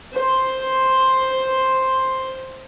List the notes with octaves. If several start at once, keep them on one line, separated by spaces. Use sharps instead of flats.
C5 C6